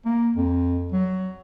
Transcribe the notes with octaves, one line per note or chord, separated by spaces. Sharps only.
A#3
F2
F#3